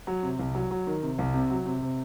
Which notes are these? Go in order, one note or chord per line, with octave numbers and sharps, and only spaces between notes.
F#3
C3
C2
F#3
F#3
D#3
C3
C2
C3
F#3
C3
C3